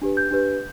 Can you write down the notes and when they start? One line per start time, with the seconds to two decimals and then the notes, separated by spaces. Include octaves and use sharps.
0.02 D4 G4 B4
0.17 G6
0.31 D4 G4 B4